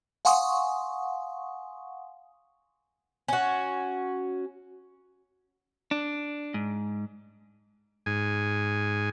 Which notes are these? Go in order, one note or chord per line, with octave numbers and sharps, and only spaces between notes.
F5 F#5 G#5 C6 C#6 D#6
C#4 F#4
D4
G#2
G#2 G#5